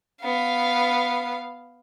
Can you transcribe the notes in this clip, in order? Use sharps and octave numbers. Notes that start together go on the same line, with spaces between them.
B3 F5